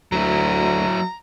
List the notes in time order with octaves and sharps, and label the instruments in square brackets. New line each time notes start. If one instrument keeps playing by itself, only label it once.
[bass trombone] D2 [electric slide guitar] F#3 E4 [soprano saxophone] A#5